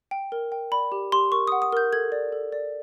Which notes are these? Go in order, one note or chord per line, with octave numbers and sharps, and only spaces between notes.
G5
A#4
G5
D5 B5
G4
G4 C6
A#4 C#6
F#5 D#6
D#6
A#4 G6
A4 G#6
D5
A4
D5